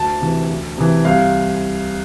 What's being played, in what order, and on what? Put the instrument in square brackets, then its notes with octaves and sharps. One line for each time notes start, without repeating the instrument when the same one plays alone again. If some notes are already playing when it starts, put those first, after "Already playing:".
Already playing: [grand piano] D2 A5
C3 E3
D2
C3 E3
C2 F5